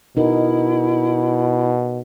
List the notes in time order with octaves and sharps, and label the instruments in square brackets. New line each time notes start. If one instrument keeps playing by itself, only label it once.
[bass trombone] B2 [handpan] D#4 A#4 [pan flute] E4